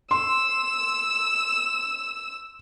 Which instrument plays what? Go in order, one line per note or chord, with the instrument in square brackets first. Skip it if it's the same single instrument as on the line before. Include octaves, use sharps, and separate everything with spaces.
[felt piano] C6 [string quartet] E6